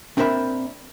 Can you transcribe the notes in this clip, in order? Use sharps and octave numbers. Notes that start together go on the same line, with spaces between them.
A#2 C4 D4 A#4 E5 B5